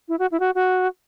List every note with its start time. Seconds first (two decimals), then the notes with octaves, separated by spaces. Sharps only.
0.09 E4
0.19 F#4
0.32 E4
0.40 F#4
0.55 F#4